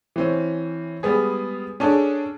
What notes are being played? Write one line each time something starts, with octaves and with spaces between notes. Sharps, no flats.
E3 C4 C#4
G3 G#3 B3 G#4
C#4 D4 G#4 A4 D5